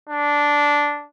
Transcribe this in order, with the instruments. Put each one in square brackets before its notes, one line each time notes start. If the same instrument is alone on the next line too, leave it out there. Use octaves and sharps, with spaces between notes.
[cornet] D4